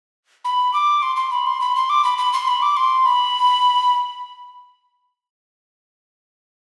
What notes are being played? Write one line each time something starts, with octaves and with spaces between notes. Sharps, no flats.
B5
D6
C6
C6
B5
C6
B5
C6
D6
B5
B5
C6
B5
D6
C6
B5